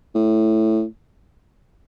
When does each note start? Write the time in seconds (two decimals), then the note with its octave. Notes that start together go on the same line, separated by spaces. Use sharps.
0.15 A2